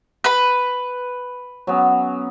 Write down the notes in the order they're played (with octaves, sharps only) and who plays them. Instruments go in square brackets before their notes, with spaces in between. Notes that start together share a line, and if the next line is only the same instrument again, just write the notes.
[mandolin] B4 B5
[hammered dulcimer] F#3 B3 C#4